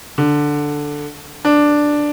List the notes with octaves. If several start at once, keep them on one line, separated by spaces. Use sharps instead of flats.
D3
D4